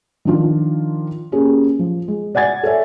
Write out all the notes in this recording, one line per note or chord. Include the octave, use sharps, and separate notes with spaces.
D#3 F3 D4 F4
A#3 C#4 G4 G#4
F3
G#3
D5 F#5 G#5 G#6 A6
A4 C#5 D5 E5 G#5